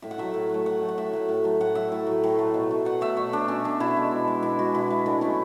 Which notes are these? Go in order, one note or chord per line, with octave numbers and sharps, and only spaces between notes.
A2 E5
F#5
F#3 A3 E5
A2
F#3 A3
A2 F#5
F#3 A3
F#5
A2 E5
F#3 A3
A2
F#3 A3
A2 F#5
F#3 A3 E5
A2
F#3 A3
A2
F#3 A3
B2
A3
B2 F#5
A3 E5
B2 C#5
A3 D4
B2 C#4
A3 D4
B2 E4
G#3
B2
G#3
B2 E4
G#3 F#4
B2 E4
G#3
A2 D4
F#3 A3 C#4